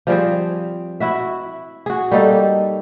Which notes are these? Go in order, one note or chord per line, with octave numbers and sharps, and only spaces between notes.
F3 G3 C4 G#4
E4 F#4 E5
F#4 G#4
G3 A#3 D#4 A4